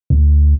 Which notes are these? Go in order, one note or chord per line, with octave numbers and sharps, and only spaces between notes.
D2